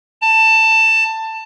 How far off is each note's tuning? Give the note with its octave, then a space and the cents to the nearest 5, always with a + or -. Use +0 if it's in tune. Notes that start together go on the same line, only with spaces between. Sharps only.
A5 +15